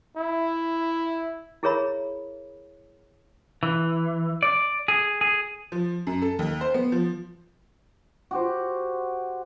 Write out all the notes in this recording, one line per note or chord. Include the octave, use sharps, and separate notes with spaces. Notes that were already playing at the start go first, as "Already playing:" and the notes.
E4
E4 G#4 A#4 C#5 E5 B5
E3
D5
G#4
G#4
F3
F#2
A4
D#2
C5
B3
F3
F#4 G4 C5